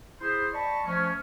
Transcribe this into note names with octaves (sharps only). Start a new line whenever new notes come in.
E4 G#4 C5
D5 D#5 A5 B5 C#6
F3 A3 C#4